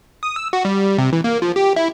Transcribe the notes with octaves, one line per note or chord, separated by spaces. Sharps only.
D#6
E6
F#4
G3
C3
E3
A#3
F3
G4
E4